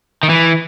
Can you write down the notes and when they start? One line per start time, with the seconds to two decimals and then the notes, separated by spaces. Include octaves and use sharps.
0.23 D#3
0.30 E3